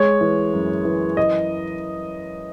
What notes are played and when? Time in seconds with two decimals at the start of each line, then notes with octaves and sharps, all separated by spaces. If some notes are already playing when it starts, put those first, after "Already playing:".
Already playing: G#3 C#5
0.21 E3
0.54 F#2
0.85 E3
1.17 D#5